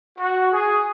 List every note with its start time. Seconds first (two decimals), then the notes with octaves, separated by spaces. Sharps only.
0.18 F#4
0.52 G#4